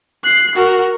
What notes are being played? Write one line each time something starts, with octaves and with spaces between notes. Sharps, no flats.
F#6 C7
F#4 A#4